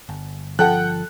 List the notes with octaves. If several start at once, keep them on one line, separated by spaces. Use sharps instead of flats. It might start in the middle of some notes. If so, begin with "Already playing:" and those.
G1
F3 A4 F#5 G5 F#6